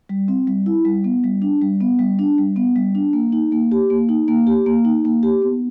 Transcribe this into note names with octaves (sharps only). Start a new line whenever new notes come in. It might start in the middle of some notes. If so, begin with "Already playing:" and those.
G3
C4
G3
E4
G3
B3
G3
D4
G3
B3
G3
D4
G3
B3
G3
D4
A#3
D#4
A#3
G4
A#3
D#4
A#3
G4
A#3
D#4
A#3
G4
B3